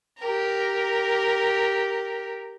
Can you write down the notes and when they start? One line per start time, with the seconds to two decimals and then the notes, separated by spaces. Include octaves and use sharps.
0.19 G4 A#4